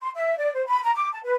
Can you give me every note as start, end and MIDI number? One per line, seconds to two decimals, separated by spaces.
0.01 0.09 84
0.15 0.35 76
0.38 0.53 74
0.54 0.63 72
0.67 0.81 83
0.83 0.91 82
0.95 1.09 86
1.12 1.19 81
1.24 1.35 71